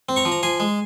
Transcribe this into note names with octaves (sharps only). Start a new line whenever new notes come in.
C4
A#5 C#6
F3
A#5
F3 G#5 C6
G#3